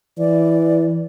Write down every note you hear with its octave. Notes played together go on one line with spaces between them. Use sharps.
E3 D5